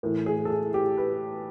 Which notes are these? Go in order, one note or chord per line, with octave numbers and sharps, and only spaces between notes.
A2 E3 A#4
G#4
A4
G#4
G4
B4